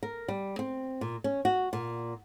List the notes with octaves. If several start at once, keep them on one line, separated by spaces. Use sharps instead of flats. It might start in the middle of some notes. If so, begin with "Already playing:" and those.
A#4
G3
C4
A#2
C#4
F#4
A#2